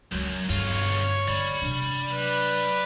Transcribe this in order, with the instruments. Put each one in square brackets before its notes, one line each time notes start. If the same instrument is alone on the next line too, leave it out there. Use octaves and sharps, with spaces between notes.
[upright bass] C#2 D#3 [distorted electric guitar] F#2
[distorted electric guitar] B1 F4 [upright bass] G2 D3 [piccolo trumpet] C#5
[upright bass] D3 C4 [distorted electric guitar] D5 B5
[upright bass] C3 D4
[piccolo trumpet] B4